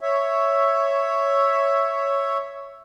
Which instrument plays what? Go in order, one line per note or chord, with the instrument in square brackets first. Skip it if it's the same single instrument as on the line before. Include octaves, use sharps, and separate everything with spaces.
[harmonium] C#5 E5